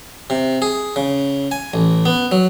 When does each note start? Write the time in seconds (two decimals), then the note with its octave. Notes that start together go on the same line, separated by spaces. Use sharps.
0.30 C3
0.62 G#4
0.96 C#3
1.51 G#5
1.74 A1
2.06 B3
2.32 F#3